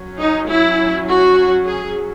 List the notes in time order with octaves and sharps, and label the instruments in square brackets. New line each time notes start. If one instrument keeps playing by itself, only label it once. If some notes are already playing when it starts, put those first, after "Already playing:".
Already playing: [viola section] F#3 C#4
D#4
E4
F#4
G#4